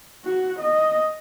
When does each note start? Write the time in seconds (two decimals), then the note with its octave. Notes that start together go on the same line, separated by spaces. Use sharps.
0.25 F#4
0.59 D#5